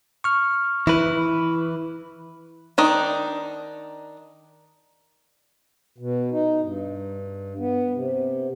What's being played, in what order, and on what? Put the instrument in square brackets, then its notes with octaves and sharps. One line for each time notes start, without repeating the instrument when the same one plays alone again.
[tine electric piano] C#6 F6
[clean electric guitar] E3 B4 [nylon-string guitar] E4
[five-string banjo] D#3 D4 D#4
[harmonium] B2
D#4
G2
B3
C3